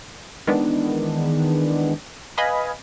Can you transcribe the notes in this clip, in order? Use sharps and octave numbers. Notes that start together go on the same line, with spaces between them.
D#3 E3 G#3 B3 D4
B4 D#5 F5 G#5 B5